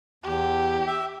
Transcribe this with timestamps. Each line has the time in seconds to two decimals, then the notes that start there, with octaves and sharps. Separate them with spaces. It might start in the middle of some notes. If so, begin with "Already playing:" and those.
0.24 E2 G4
0.87 E5